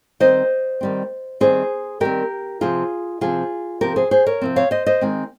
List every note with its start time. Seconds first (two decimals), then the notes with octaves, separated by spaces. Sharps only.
0.20 D#3 G3 C4 C5 D#5
0.81 D#3 G3 C4
1.40 D#3 G3 C4 G#4 C5
2.00 D#3 G3 C4 G4 A#4
2.61 C3 F3 C4 F4 G#4
3.21 C3 F3 C4 F4 G#4
3.81 C3 F3 C4 G4 A#4
3.96 G#4 C5
4.11 G#4 C5
4.26 A#4 C#5
4.41 C3 F3 C4
4.56 C#5 F5
4.71 C5 D#5
4.86 C5 D#5
5.01 D#3 G#3 C4